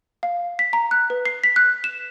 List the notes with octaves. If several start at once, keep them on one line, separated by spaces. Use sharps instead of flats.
F5
B6
A#5
F#6
B4
C7
B6
F#6
E7